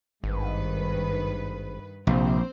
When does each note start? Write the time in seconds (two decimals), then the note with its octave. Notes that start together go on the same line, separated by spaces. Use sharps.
0.24 G#1 G2 D#3 B4
2.07 A#1 C3 C4 C5